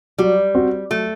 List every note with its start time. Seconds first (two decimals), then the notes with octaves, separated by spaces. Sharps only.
0.18 F#3 G3
0.55 C4 F#4 C5
0.90 F#3 A3